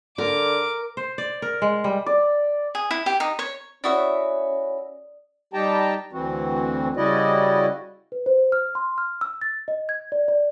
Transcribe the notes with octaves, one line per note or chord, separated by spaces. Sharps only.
D3 A#4 D6
C5
D5
A#4
G#3
G3
D5
G#4
E4
G4
D#4
C#5
C#4 E4 F#4 D5 E5 D#6
G3 D#4 G4 G5 A5 A#5
D2 E3 C4 F#4
C#3 G3 E4 F#4 D5 D#5
B4
C5
F6
C6
F6
E6
A6
D#5
G#6
D5
D5